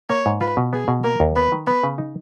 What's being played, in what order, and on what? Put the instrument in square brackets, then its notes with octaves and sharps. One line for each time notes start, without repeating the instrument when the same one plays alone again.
[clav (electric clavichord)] A#3 [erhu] C#5
[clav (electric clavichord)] G#2
[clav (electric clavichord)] F4 [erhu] B4
[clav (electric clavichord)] B2
[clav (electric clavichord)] B3 [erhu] G#4
[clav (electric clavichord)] B2
[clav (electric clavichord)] A#3 [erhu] A#4
[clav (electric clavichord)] D#2
[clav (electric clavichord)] B3 [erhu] B4
[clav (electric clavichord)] D#3
[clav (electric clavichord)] B3 [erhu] B4
[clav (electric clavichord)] C#3
D#4